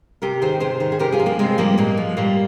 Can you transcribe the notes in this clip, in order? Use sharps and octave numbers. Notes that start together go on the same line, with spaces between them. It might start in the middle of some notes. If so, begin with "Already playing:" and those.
C3 G4 A#4
D#3 G#4 C5
C3 G#4 C5
D#3
G#4
C3 G4 A#4
F4 G#4
F3
A#3 D4
C3 G#3 C4
F3 G3 A#3
A#2 G#3
F3
A#2 G3 A#3